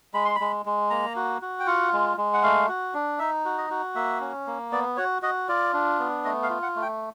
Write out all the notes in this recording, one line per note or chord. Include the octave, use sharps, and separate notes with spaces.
G#3 B5
C6
B5
G#3
G#3
A#3 A#5
F#4
F#4
G5
F4 F#5
G#3
G#3
F#5
A3 F5
F#4
D4
D#4 E5
F#4
D#5
F#4
A#3 E5
C#4
A#3
B3 D5
F#4 C#5
F#4 D#5
F4 D5
D4
B3
A3 D#5
F5
F4
F#5
A3
G5